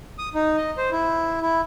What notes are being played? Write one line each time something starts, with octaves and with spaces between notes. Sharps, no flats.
D#6
D#4
D#5
C5
E4
E4